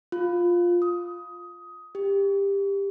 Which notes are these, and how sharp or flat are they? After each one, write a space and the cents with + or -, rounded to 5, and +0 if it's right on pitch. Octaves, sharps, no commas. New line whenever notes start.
F4 +5
D#6 +15
G4 +20